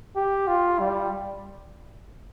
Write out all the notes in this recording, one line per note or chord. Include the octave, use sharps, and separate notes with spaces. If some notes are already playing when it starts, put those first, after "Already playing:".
G4
F4
G3